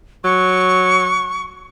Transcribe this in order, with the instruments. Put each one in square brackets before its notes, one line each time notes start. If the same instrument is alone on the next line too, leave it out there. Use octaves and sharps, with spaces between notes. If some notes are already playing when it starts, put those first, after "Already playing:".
[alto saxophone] F#3 [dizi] C#6